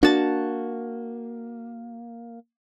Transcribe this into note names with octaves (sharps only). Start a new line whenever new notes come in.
A#3 D4 F#4 A5